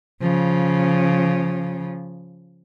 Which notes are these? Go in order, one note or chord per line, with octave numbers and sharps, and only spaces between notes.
C#3 F3